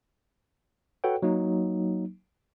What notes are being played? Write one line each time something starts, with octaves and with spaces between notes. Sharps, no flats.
F#4 A4 B4 C#5 F#5 G5
F#3 A#3 D#4